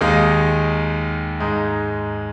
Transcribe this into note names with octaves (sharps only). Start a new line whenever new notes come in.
D#2 D#3 G#3 D#4
G#2 G#3 D#4